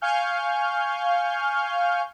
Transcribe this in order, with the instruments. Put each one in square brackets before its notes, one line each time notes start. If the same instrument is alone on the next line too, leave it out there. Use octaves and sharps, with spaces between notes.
[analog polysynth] F5 G#5 C#6 F6 G6